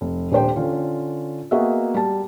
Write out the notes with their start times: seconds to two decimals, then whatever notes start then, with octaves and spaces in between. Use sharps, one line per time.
0.01 F1
0.32 D#1 D4 G4 C5 G5
0.56 D3 C#4 F4
1.51 A#3 B3 F#4 G#4 D#5 E5
1.95 G3 A5